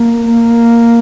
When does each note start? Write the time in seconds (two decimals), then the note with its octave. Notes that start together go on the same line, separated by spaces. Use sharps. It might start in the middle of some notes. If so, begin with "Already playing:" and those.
Already playing: A#3
0.29 A#3